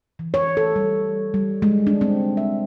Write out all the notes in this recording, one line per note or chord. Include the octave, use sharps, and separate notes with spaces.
E3
C#5
A4
G3
G3
G#3
D4
C4
E5